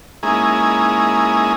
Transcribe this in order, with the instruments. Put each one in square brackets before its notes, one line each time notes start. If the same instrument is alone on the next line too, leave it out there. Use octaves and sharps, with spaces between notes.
[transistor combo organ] G#3 A#3 C#4 D#4 E4 G#4